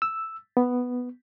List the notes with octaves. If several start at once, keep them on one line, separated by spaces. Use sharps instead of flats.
E6
B3